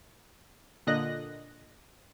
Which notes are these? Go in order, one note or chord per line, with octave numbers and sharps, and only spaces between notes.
A#2 D3 D#5 F#6 A#6